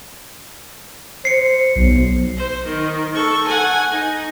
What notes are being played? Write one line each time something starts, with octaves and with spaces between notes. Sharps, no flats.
C5 C7 C#7
B1
C5
D#3
A4 C#6
F#5 G#5
D#4